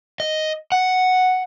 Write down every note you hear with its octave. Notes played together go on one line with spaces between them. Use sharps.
D#5
F#5